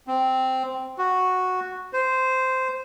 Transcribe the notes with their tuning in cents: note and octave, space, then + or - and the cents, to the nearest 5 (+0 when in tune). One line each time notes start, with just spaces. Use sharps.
C4 -5
F#4 -5
C5 -10